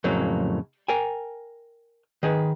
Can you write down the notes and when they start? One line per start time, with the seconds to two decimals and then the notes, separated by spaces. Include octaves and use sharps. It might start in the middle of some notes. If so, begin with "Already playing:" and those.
0.04 F2 A2 C#3 F#3 A#3
0.88 A#4 G5 G#5
2.23 D#3 G#4 B4